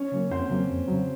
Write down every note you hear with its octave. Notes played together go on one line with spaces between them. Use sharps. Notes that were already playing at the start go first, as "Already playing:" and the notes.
Already playing: C#4 C#5
C#3 F#3 A#3
F2 C4 C5
C#3 F#3 A#3
F2
C#3 F#3